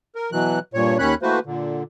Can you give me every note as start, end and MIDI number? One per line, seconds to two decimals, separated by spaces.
0.15 0.31 70
0.32 0.59 47
0.32 0.59 52
0.32 0.59 54
0.32 0.59 90
0.74 0.98 43
0.74 0.98 46
0.74 0.98 73
0.99 1.15 39
0.99 1.15 51
0.99 1.15 61
0.99 1.15 73
0.99 1.15 83
0.99 1.15 90
1.22 1.39 52
1.22 1.39 57
1.22 1.39 58
1.22 1.39 66
1.22 1.39 71
1.22 1.39 72
1.46 1.83 46
1.46 1.83 50